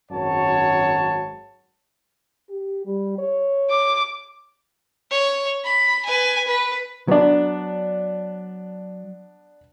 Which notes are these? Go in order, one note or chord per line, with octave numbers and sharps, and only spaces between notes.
G#1 F#2 F#3 C#5 A5
G4
G3
C#5
D6
C#5
B5
B4 G#5
B4
F#3 B3 D4